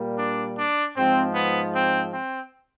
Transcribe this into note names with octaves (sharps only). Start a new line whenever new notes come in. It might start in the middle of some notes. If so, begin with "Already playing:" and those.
Already playing: A#2 G3 A#3
D4
D4
G#2 F3 G#3 C4
B3
C4
C4